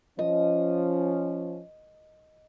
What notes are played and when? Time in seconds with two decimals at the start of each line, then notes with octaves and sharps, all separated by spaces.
0.19 F3 C#4 D#5